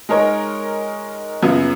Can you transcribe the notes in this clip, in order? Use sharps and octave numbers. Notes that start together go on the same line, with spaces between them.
G#3 D#4 A#4 C#5
F#2 C#3 F#3 B3 F4